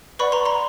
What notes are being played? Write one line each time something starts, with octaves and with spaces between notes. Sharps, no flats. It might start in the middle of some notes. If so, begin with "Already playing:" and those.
B4 D5 F#5 B5 C#6
A#5 C6
A#5 C6